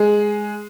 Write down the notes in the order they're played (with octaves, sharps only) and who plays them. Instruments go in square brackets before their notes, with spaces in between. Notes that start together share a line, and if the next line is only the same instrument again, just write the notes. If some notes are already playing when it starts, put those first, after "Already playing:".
Already playing: [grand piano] G#3 G#4